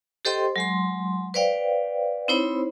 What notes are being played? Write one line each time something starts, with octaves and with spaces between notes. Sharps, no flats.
G4 A4 C5 D#5 G5 C6
F#3 G#3 C6
B4 C5 D5 F5 G5
C4 D#4 E4 C5 C#5 B5